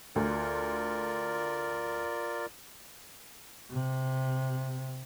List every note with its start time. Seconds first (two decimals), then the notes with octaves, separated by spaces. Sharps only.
0.16 D2 F4 A#4 D5
3.71 C3